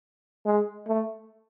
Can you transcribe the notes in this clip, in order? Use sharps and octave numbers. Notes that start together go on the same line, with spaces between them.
G#3
A3